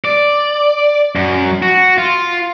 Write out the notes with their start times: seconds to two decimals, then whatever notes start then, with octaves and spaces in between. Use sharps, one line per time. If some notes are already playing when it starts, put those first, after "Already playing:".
0.05 D5
1.16 F#2
1.62 F#4
1.98 F4